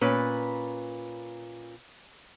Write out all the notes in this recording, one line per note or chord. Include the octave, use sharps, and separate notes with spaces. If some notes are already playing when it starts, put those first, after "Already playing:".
A#2 C#4 B4